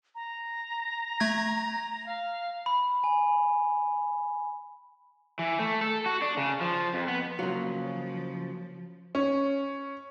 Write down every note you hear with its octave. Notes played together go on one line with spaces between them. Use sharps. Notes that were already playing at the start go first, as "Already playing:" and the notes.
A#5
A3 G#6
F5
B5
G#5
E3
A3
A4
F#4
D4
C#3
F3
F2
B3
C#3 F3 F#3 A#3 F4
C#4